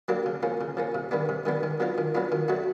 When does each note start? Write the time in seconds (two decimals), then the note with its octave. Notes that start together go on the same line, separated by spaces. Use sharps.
0.08 F#3 A#3 D4 G4
0.26 C#3
0.43 F3 A#3 C#4
0.61 C#3
0.77 F3 A#3 C#4
0.95 C3
1.11 D#3 G3 B3 D4
1.29 C3
1.46 D#3 G3 B3 D4
1.63 D#3
1.80 F#3 B3 D4 F4
1.98 D#3
2.15 F#3 B3 D4 F4
2.32 D#3
2.48 F#3 A3 D4 F#4